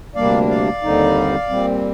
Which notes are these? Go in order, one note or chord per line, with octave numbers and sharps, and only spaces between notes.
D2 C3 G3 A#3 D4 D5 F5
D5 F5
D#2 D3 G3 C4 D#4
A#2 G3 C4